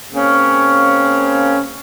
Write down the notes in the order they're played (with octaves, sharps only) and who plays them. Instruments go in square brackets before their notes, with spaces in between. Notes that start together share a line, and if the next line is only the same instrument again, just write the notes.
[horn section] C#3 A#3 C4 C#4